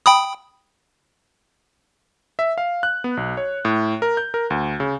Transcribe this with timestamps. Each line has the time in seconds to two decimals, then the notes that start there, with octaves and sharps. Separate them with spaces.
0.06 G5 B5 D#6
2.39 E5
2.58 F5
2.83 F#6
3.04 B3
3.17 B1
3.37 C#5
3.65 A2
4.02 A#4
4.17 G6
4.34 A#4
4.50 D2
4.80 C#3